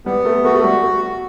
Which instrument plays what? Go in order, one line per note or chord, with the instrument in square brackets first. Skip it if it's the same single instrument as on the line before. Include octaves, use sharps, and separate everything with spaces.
[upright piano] G3 [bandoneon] B3
[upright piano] A3
[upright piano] A3 [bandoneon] F#4
[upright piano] A3
G3